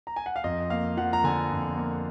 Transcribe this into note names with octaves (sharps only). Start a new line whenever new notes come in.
A#5
G#5
F#5
F5
F2 D#5
A#3 F5
F3 F#5
A#5
D3 G#5
F2
A#3